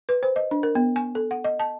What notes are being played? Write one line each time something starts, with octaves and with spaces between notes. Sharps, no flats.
B4
C5
D#5
D4
A#4
B3
G#5
A4
F#5
D#5
A5